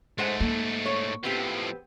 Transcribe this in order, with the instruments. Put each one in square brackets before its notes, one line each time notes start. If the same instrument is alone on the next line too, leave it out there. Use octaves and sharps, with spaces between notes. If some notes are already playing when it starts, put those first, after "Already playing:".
[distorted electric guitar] G#2 A3 [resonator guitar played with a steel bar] G#3 C5 F#5
[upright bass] A#3 [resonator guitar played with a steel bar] A4
[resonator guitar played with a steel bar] C#5
[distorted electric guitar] A2 F3 [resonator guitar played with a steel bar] B3 C4 G4